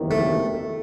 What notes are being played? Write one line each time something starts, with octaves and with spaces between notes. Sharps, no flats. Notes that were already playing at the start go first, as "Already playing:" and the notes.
Already playing: F#1 E2 C3 D#3
A3